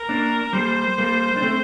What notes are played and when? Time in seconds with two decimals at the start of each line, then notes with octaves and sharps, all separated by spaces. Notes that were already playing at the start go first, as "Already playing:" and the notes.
Already playing: A#4
0.09 A#3 D4
0.53 G3 A#3 C5
0.98 G3 A#3
1.36 D4
1.42 A3 C4